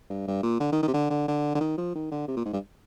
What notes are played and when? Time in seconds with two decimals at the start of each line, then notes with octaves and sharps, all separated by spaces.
0.10 G2
0.27 G2
0.43 A#2
0.60 D3
0.72 D#3
0.83 D#3
0.88 C3
0.94 D3
1.10 D3
1.28 D3
1.55 D3
1.60 D#3
1.77 F3
1.95 D#3
2.11 D3
2.28 C3
2.37 A#2
2.45 G#2
2.53 G2